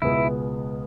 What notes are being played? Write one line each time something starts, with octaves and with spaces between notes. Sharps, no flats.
C#2 B2 G#3 B3 E4